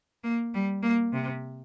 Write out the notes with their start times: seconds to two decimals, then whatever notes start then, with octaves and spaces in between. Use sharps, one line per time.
0.24 A#3
0.54 G3
0.83 A#3
1.13 C3